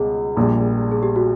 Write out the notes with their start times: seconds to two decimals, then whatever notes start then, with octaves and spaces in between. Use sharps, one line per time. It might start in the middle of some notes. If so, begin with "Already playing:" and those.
Already playing: C#2 B2 G3 G#4
0.37 A#1 A#2 G3
0.91 G#4
1.03 G4
1.16 F#4